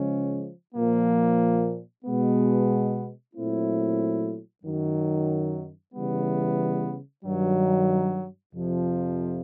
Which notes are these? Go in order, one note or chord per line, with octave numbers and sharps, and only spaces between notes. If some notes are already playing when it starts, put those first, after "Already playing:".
Already playing: C#3 F3 G#3 C#4
A#2 F3 A#3
B2 G#3 B3
A#2 F#3 A3 C4 E4
F#2 D#3 F#3
C#3 E3 G3 B3
G2 D#3 F#3
F2 C3 F3